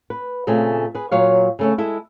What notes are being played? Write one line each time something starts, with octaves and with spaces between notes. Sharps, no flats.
B4
A#2 C#3 A3 C4 G#4
G#4 B4
A#2 F#3 C#5 F5
C#3 A3 C#4
G#3 E4 A4